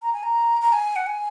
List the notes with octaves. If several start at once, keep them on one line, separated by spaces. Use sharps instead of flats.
A#5
G#5
A#5
A#5
G#5
F#5
G#5